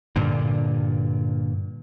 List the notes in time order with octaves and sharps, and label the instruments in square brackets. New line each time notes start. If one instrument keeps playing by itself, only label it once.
[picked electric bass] G2 A#2 D3